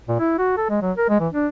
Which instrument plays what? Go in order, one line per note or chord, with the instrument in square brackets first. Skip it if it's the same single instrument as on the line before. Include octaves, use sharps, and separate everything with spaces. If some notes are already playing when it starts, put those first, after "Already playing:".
[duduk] A#2
E4
F#4
A4
G#3
F#3
A#4
G#3
E3
D4